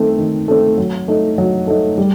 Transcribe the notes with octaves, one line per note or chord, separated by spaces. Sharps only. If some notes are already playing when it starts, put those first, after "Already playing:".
Already playing: D#3 A3 C4
D#3
A3 C4
F#3
A3 D#4
F#3
A3 D#4
G3